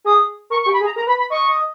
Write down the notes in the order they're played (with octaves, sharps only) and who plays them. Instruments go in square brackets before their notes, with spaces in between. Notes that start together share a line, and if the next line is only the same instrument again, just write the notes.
[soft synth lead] G#4 [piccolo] D#6
[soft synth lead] A#4 [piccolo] C#6
[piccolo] C#6
[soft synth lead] G4
[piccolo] B5
[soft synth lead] G#4
[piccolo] A#5
[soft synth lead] A#4 [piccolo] A#5
[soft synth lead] B4 [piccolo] B5
[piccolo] B5
[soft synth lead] D#5 [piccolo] C#6